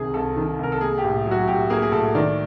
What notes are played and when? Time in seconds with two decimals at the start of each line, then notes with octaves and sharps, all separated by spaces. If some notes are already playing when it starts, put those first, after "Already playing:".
Already playing: C2 C3 D#3 G#4
0.14 C2 A4
0.37 D#3
0.59 C2 A#4
0.72 A4
0.81 A#3 G#4
0.98 G4
1.04 A2
1.26 F#3
1.31 F#4
1.47 A2 G4
1.70 A#3 G#4
1.82 G#4
1.91 A2 A4
2.15 D#3 D5